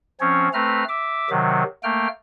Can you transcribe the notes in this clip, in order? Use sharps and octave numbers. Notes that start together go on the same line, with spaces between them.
F3 C4 C#4 C#5
A3 C4 B4 A#5 F6
E5 D6
C3 D#3 F#3
A3 A#3 G5 F6